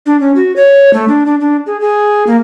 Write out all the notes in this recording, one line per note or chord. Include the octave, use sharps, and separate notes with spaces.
D4
C#4
F#4
C#5
A3
D4
D4
D4
G#4
G#4
A#3